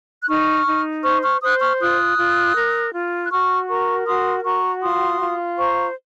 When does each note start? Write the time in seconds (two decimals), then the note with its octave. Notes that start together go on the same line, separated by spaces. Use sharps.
0.21 F#6
0.28 D#4 C#6 F6
0.66 D#4
1.03 C5 C#6 F6
1.23 C#6 F6
1.42 C5 D#6 F#6
1.61 C#6 F6
1.79 F4 D#6 F#6
2.18 F4
2.55 A#4
2.93 F4
3.24 F#6
3.31 F#4 C#6 F6
3.69 A#4 A#5 C#6
4.06 F#4 C6 D#6
4.44 F#4 A#5 C#6
4.82 F4 C6 D#6
5.20 F4
5.59 C5 A#5 C#6